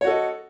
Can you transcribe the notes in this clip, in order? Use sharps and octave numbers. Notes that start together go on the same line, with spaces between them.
F#4 A4 C#5 D#5